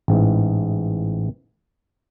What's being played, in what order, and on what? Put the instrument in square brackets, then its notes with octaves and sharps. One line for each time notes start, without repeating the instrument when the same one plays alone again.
[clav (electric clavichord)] A1 G#2 E3